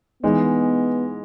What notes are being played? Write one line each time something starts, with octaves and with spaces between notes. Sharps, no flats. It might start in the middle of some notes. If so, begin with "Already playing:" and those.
E3 G#3 B3 D#4